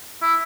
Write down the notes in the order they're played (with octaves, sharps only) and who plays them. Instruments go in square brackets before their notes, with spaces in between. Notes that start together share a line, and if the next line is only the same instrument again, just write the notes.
[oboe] E4